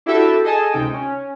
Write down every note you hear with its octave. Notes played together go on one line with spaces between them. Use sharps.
D4 E4 F#4 G4 A4 E5
G#4 A4 D#5 G#5 A5
C#2 C3 D#4 G5
C#4